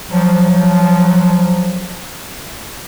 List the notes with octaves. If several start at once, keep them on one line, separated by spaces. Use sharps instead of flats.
F3 F#3